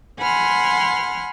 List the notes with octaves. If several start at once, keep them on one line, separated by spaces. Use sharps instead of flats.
F#5 G#5 B5 C6 F6